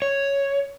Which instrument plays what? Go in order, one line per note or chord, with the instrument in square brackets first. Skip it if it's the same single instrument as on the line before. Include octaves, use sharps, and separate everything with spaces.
[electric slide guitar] C#5